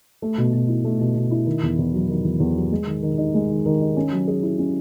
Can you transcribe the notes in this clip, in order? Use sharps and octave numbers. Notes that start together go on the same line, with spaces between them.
A3
B2
B2
E4
A3
B2
B2
E4
D#3
E2
E2
F#3
D#3
E2
E2
F#3
G#3
D#3
D#3
D#4
G#3
D#3
D#3
D#4
C#4
F#3
G#4
E4
C#4